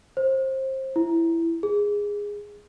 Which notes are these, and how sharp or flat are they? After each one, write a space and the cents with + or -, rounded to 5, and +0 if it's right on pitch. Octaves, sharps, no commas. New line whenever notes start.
C5 +25
E4 +10
G#4 -15